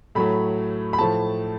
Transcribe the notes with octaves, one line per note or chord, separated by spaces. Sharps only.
A2 F#3 A3 B5
B5
A2 F3 A3 A5